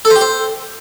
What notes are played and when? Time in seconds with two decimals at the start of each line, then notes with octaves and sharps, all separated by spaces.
0.05 A4
0.10 C5
0.16 G4
0.21 C5